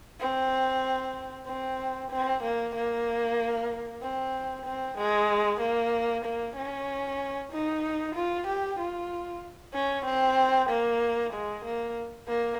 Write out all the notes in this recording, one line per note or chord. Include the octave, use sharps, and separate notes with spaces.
C4
C4
C4
A#3
A#3
C4
C4
G#3
A#3
A#3
C#4
D#4
F4
G4
F4
C#4
C4
A#3
G#3
A#3
A#3